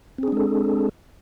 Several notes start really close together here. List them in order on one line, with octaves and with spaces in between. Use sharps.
C4 G#4 D4 G#3 A4